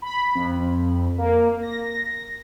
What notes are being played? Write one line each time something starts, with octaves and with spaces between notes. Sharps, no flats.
B5
F2
A#3
A#6